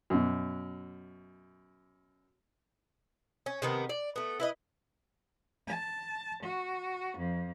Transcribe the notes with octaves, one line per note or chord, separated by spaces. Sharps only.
F#2 B2
C#4
C3 D#3 B3
D5
A3 B3
E4 B4 D#5
A5
F#4
F2